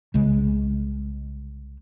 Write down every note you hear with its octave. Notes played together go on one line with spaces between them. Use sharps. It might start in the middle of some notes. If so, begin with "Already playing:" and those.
C2 C#3 G#3